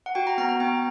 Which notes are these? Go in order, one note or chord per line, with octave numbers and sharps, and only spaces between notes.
F#5
F#4 G5
A#5
B3 A#5
A#5
B3 G5